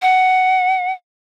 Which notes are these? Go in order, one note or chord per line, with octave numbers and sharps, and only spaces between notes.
F#5